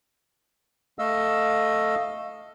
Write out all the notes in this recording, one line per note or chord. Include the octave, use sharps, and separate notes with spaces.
A3 D#5 F5 E6